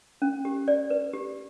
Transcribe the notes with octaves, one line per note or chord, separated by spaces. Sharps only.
C#4
G4
D5
B4
G4